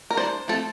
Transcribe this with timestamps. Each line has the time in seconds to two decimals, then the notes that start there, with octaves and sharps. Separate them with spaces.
0.11 A#4
0.17 E3 G3 D4 C5
0.48 F3 A3 C4 A4